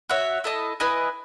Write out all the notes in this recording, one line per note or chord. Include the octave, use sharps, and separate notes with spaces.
F#4 C#5 E5
E4 A4 D#5 A5
E4 B4 D#5 G#5